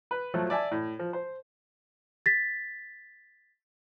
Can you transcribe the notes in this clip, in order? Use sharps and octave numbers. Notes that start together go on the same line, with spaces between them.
B4
F3 F#3 A3 A4
D5 E5 G#5 A5
A2
F3
C5
A6 B6